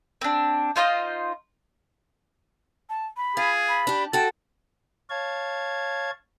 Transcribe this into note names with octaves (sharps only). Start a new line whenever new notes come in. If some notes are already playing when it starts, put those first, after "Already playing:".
C4 D4
D#4 F4 C5 D#5
A5
B5
F4 G#4
B5
D4 G4
F#4 A4 G5 A5
C#5 F5 A5 G#6